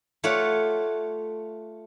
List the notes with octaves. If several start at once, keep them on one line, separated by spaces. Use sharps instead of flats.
A3 F4 C#5 D5 F#5